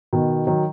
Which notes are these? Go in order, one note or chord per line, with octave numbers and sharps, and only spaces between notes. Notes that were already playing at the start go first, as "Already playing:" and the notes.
B2 D#3
D#3 F#3